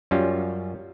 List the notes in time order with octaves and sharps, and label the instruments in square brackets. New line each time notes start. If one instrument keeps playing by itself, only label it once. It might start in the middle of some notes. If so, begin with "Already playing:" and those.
[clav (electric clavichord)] F#2 G3 C#4 F4